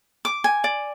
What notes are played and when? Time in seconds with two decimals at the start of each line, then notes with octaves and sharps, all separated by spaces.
0.25 D6
0.44 G#5
0.64 D5